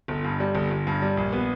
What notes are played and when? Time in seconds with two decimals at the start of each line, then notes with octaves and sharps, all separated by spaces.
0.08 G1
0.24 G2
0.40 G3
0.55 G1
0.71 G1
0.87 G2
1.02 G3
1.17 A#1
1.32 B3